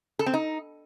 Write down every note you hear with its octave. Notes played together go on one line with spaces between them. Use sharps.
A4
C4
D#4